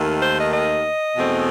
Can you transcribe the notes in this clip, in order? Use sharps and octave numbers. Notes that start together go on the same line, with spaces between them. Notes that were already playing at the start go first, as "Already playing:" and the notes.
Already playing: D#2 D#3 A3
C5
D#5
D#5
E2 B2 A3 C4